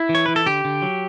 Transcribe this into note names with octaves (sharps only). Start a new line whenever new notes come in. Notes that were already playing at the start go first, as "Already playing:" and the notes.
Already playing: E4
E3
C#5
E3 B4
A4
D3 G4
D3
F#3